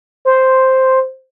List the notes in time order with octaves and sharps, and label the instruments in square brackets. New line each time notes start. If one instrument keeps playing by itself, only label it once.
[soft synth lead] C5